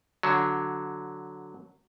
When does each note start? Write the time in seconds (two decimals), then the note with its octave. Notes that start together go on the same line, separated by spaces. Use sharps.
0.23 D3 F#3